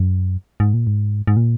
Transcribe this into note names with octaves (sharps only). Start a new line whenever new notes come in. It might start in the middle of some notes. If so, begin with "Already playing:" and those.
Already playing: F#2
G#2
A#2
G#2
G#2
A#2